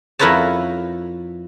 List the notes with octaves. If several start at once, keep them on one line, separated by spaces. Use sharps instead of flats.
F2 E4 A#4 B4 C#5 A5